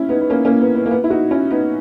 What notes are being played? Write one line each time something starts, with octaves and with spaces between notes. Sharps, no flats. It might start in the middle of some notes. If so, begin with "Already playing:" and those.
Already playing: C#4 E4
B3 D#4
B3
A#3 C#4
A#3 C#4
B3
B3
A#3
B3
E4
D#4 F#4
C#4 E4
B3 D#4